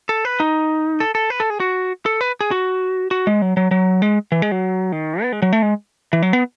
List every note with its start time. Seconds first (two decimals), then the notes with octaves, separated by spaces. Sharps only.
0.09 A4
0.25 B4
0.40 D#4
1.00 A4
1.15 A4
1.30 B4
1.40 A4
1.50 G#4
1.60 F#4
2.06 A4
2.21 B4
2.41 G#4
2.51 F#4
3.11 F#4
3.27 G#3
3.42 F#3
3.57 F#3
3.71 F#3
4.02 G#3
4.32 E3
4.42 G#3
4.52 F#3
4.92 D#3
5.22 B3
5.32 G#3
5.42 F#3
5.53 A3
5.62 G#3
6.13 E3
6.22 F#3
6.33 B3